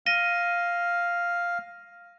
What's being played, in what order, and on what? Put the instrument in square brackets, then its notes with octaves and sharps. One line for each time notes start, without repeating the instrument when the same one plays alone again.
[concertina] F5 [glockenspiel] A#6 D#7 G7